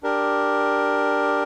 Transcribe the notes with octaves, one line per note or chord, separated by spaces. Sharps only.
D4 G4 A#4